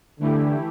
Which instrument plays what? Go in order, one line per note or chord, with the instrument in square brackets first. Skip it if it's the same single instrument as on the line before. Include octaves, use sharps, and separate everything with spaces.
[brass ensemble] D3 [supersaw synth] E3 A3 E4 G4